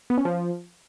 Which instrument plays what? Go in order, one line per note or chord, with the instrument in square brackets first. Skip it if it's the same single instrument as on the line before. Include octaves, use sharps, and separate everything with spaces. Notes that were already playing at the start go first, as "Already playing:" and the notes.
[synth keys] B3
C#4
F3